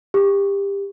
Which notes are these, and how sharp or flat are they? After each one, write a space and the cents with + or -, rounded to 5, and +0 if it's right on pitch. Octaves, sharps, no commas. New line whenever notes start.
G4 +25